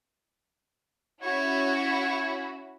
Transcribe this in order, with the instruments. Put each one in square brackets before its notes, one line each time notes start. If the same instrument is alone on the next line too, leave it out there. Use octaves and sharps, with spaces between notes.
[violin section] C#4 E4 F#4 [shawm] C#5